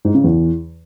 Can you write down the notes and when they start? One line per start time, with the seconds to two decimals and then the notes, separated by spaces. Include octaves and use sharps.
0.05 G#2
0.14 C#3
0.24 E2